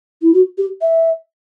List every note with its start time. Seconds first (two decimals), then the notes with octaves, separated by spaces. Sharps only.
0.22 E4
0.34 F#4
0.58 G4
0.81 E5